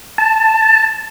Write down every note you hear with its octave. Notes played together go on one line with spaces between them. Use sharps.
A5